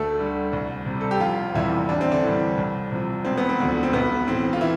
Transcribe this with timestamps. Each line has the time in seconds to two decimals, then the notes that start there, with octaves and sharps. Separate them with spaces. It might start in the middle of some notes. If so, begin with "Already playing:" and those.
Already playing: D2 A3 A4
0.19 D3 G3
0.53 C2
0.86 C3 G3
1.01 A4
1.11 G4
1.20 F1 F3 F4
1.54 E2 C3 E3 G3 E4
1.89 A1 D4
2.01 C4
2.11 D3 D4
2.24 A2 E3 G3
2.57 C2
2.92 C3 F3
3.25 E1 C4
3.37 B3
3.49 C4
3.60 D2 D3 F3
3.83 C4
3.93 B1 B3
4.27 A2 E3 C4
4.53 F4
4.61 E3 E4